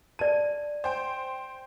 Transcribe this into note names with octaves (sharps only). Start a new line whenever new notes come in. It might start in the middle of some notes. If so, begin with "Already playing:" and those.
D5 A5 D#7
C5 G5